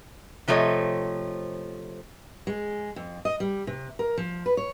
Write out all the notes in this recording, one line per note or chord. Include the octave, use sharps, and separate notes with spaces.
C3 F3 A3 A4 C#5 D#5
G#3
F2
D#5
G3
C3
A#4
F3
B4
C#5